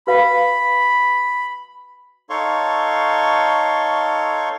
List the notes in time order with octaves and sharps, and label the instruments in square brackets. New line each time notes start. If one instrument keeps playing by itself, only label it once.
[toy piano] F#4 B4 F5 [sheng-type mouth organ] B5
[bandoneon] D#4 A4 C#5 F5 C6 C#6